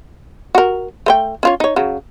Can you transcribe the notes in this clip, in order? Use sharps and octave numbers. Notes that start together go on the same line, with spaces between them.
F#4 A#4
A3 C5 G5
C#4 F4 C#5
D#4 C#5
C#3 F#3